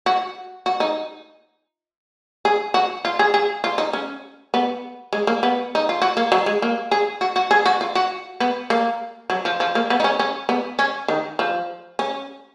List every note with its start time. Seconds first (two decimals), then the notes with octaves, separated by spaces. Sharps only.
0.06 F#4
0.66 F#4
0.80 D#4
2.45 G#4
2.74 F#4
3.05 F4
3.19 G#4
3.34 G#4
3.64 F4
3.78 D#4
3.93 C#4
4.54 B3
5.13 G#3
5.27 A#3
5.43 B3
5.75 D#4
5.89 F4
6.02 F#4
6.17 A#3
6.32 F#3
6.46 G#3
6.62 A#3
6.91 G#4
7.21 F#4
7.36 F#4
7.51 G#4
7.66 F#4
7.81 F4
7.95 F#4
8.40 B3
8.70 A#3
9.30 F#3
9.45 F3
9.60 F3
9.75 A#3
9.90 B3
10.00 D#4
10.04 C#4
10.19 C#4
10.49 B3
10.79 C#4
11.08 D#3
11.39 F3
11.99 C#4